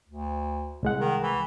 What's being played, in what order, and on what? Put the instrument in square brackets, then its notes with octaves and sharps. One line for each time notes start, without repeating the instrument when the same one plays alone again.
[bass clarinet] D2
[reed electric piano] C2 G#3 F#5
[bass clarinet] D#3
E3